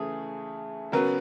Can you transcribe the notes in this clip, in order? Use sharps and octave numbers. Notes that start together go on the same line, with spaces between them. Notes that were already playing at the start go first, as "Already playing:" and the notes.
Already playing: C#3 E3 A3 G#4
C#3 F#3 B3 A#4